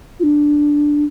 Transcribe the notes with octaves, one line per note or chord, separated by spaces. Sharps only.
F4
D4